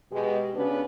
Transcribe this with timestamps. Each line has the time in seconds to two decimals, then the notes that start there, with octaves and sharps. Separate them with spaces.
0.11 B2 G#3 G4
0.54 C#3 B3 C#4 D4 F#4 B4